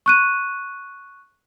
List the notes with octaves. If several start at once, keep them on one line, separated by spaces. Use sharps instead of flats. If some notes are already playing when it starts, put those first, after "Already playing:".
C#6 F#6 D#7